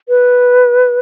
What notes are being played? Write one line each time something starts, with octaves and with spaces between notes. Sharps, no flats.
B4